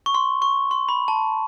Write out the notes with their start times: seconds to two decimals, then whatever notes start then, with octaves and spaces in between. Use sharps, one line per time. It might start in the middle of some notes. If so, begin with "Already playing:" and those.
0.06 C#6
0.14 C6
0.42 C#6
0.71 C6
0.89 B5
1.08 A5